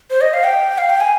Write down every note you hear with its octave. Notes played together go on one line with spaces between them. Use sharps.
C5
D#5
F5
G5
F5
G5
G#5